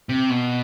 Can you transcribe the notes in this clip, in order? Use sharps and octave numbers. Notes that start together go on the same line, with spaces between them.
C3
B2